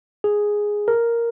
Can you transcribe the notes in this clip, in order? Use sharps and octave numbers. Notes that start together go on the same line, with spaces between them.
G#4
A#4